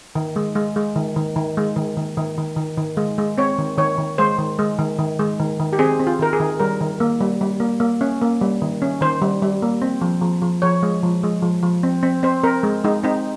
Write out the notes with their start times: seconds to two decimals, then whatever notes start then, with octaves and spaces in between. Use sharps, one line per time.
0.15 D#3
0.36 G#3
0.55 G#3
0.76 G#3
0.96 D#3
1.16 D#3
1.36 D#3
1.57 G#3
1.76 D#3
1.97 D#3
2.17 D#3
2.38 D#3
2.57 D#3
2.78 D#3
2.97 G#3
3.18 G#3
3.38 C4 C#5
3.58 D#3
3.78 D#3 C#5
3.98 D#3
4.18 G#3 C5
4.38 D#3
4.59 G#3
4.79 D#3
4.99 D#3
5.20 G#3
5.40 D#3
5.60 D#3
5.73 G4
5.79 C4 G#4
5.99 C4
6.07 F4
6.19 D#3 A#4
6.33 G#4
6.40 D#3
6.60 G3 A#4
6.81 D#3
7.00 A#3
7.21 G3
7.41 G3
7.60 A#3
7.80 A#3
8.01 C#4
8.21 A#3
8.41 G3
8.62 D#3
8.82 C#4
9.01 D#3 C5
9.22 G3
9.42 G3
9.62 A#3
9.82 C4
10.01 F3
10.22 F3
10.42 F3
10.62 F3 C#5
10.83 G#3
11.03 F3
11.23 G#3
11.42 F3
11.63 F3
11.83 C4
12.03 C4
12.23 C4 C5
12.44 C4 A#4
12.63 G#3
12.84 G#3 D#4
13.03 C4 D#4